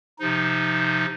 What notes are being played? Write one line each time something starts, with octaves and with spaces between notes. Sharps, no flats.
C3 F3 D#4